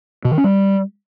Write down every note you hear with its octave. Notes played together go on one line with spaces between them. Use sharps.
B2
D#3
C#4
G3